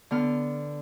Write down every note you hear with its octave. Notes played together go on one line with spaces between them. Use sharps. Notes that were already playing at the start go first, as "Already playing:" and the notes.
D3 B3 F6